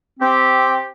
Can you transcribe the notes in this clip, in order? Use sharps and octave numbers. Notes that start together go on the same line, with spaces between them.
C4 G4